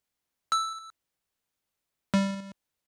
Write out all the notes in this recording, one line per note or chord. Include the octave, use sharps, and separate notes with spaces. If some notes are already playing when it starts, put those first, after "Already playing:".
E6
G3